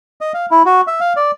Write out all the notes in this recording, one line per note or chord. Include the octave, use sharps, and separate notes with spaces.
D#5
F5
E4
F#4
E5
F5
D5